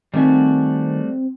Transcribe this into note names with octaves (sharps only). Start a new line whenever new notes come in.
D#3 G3 A3 C4 F#4 G#5